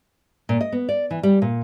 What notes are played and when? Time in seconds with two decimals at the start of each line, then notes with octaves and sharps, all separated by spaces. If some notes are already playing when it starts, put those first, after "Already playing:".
0.49 A#2
0.61 D#5
0.72 B3
0.89 D5
1.11 E3
1.23 G3
1.42 A#2